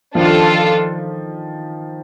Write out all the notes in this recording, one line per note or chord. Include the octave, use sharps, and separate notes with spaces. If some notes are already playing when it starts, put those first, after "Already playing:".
D#3 F3 D4 F4 A4